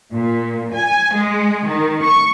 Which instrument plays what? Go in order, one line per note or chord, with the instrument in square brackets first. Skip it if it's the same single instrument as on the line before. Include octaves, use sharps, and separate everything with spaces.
[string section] A#2
G#5
G#3
D#3
C#6